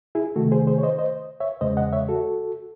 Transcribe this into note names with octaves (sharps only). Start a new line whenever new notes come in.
E4 G#4
C3 D#3 A3 F#4 A4
G#4 C5
G#4 C5
C#5
C5 D#5
C5 D#5
C#5 E5
E2 C#3 G#3 C5 D#5
D#5 F#5
C#5 E5
F#4 A4